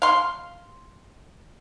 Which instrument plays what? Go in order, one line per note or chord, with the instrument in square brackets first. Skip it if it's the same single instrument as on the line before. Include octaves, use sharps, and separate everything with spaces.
[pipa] F5 C6